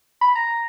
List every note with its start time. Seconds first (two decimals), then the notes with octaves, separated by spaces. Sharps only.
0.21 B5
0.35 A#5